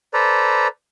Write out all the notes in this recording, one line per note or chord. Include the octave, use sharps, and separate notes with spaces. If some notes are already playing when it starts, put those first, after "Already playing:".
A4 B4 C5 D5 A#5